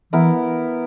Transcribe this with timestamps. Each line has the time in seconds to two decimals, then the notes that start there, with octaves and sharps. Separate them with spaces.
0.12 E3 B3 E4 A#4